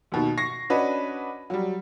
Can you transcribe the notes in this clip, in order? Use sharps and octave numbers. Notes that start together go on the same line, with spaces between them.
D#2 B2 D#3
C#6 A#6 C7
C#4 D4 F#4 B4 D#5
F#3 G3